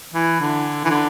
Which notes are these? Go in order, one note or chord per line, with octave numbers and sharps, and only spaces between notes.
E3
D3
E3
D3